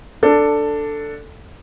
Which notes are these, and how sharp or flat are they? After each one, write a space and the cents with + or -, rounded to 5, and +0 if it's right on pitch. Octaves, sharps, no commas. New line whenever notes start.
D4 +0 A4 +10